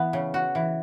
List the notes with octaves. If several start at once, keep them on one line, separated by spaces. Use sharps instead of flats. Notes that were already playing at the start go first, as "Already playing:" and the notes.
Already playing: E3 B3
C#3
F#4
E3